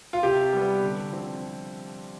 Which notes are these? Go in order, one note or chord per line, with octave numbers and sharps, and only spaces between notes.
F4
C3 G4
G3 B3
D3
F3 C4